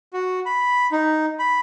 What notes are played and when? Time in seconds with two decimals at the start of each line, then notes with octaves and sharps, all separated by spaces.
0.13 F#4
0.46 B5
0.92 D#4
1.39 B5